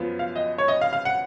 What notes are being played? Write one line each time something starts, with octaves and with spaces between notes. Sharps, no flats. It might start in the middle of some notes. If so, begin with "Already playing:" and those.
Already playing: F#2 F3 B3
F5
D#5
C#5
D#5
F5
F5
F#5